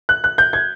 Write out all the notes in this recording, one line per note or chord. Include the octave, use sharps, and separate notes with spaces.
F#6
F#6
G6
G#6